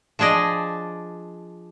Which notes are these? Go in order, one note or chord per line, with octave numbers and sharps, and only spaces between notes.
F3 D4 G#4 D5 D#5